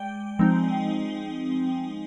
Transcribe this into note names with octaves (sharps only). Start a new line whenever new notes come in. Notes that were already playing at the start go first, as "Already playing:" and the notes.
Already playing: G#3 D5 G5
F3 G#3 C4 D#4